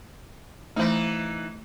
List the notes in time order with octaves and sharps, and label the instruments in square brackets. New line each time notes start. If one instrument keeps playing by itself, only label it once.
[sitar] E3 D#4 [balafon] A3 C5